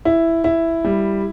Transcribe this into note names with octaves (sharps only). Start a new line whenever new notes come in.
E4
E4
G3